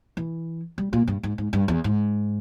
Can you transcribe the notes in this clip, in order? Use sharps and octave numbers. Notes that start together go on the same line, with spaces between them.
E3
G3
A#2
G2
G#2
G#2
G2
E2
G#2